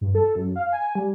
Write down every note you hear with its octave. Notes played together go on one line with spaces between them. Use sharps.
G2
A4
F#2
F5
G#5
G3